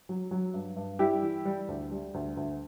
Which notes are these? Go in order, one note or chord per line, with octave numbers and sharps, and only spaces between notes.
F#3
F#3
G2
G2
G3 E4 G4
E3
G3
D2
G3
D2
D2